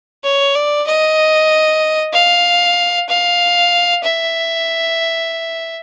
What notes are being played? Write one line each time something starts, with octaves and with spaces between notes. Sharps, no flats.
C#5
D5
D#5
F5
F5
E5